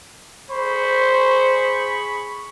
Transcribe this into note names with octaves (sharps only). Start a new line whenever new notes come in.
G#4 C5 B5 C#6